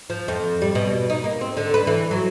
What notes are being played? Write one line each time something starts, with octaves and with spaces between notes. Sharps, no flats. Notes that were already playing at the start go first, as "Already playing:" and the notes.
F3
F2
G3
B2
D#4
A#3
C4
D3
B4
E3
F#3